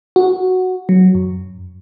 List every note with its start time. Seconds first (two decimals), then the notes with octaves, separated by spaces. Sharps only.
0.16 F#4
0.89 F#3
1.15 F#2